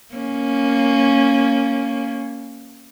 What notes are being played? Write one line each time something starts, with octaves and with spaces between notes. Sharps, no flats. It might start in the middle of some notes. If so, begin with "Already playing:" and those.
A#3 C#4